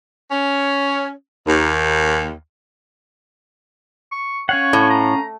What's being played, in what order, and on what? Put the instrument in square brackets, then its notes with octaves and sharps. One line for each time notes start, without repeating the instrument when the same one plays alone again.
[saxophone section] C#4
D#2
[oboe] C#6
[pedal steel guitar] C#4 F5 F#5 [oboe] C#5
[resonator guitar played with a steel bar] A2
[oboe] A#5